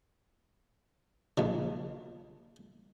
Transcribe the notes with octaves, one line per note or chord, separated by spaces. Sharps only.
A#1 C#3